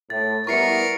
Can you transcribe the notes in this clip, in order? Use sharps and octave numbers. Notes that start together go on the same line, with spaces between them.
A2 A6
G3 B3 E4 A#4 C#6 C7 C#7